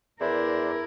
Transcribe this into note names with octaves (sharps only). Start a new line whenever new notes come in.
E2 D4 E4 A#4 C5 D5